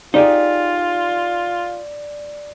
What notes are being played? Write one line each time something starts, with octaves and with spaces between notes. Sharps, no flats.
D#4 F4 G4 G#4 D5